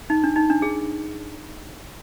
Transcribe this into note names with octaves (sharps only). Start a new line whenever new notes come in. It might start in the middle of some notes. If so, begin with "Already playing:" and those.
D#4
D4
D#4
D4
G#4